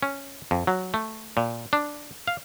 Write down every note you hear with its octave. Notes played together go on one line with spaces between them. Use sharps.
C#4
F2
F#3
A3
A#2
D4
F5